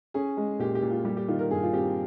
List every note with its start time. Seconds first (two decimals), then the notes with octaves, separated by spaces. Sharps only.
0.14 C#4 G#4
0.37 G#3
0.59 A#2 G4
0.75 G4
0.82 A#2
0.90 F4
1.05 G3 G4
1.17 G4
1.28 D#3 F4
1.39 A#4
1.50 G2 G#4
1.63 F4
1.73 C4 G4